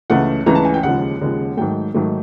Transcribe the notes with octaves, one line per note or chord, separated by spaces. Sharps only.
C#2 C#3 E3 A3 F#5
C#2 C#3 E3 A3 A#5
A5
G#5
G5
D#2 C#3 F3 G#3 F#5
D#2 C#3 F3 G#3
G#2 D#3 F#3 A3 G5
G#2 D#3 F#3 A3